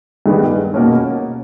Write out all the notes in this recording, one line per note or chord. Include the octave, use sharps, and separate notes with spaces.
G2 D#3 G#3 B3 G4
B2 A#3 C#4